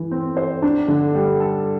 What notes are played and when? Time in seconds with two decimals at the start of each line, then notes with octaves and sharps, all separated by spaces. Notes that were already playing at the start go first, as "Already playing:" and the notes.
Already playing: E3
0.11 C4
0.37 C5
0.62 D4
0.88 D3
1.15 G3
1.40 A4